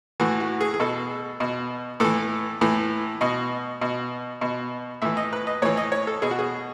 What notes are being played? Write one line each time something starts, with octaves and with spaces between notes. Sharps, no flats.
A2 E3 F#4
F#4
G#4
G#4
B2 A4
B2
A2 E3 A4
A2 E3
B2 D#5
B2
B2
A2 E3 E5
D#5
B4
D#5
A2 E3 C#5
D#5
C#5
A4
B2 G#4
F#4
G#4